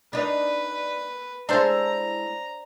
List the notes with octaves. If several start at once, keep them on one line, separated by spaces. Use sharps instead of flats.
D4 D#4 B4
G#3 D4 E4 A4 C5 A#5